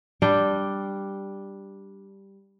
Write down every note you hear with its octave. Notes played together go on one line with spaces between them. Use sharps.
G3 D4 G5